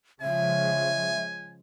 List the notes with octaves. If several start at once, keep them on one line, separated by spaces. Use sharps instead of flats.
C#3 F3 G#3 E5 G#5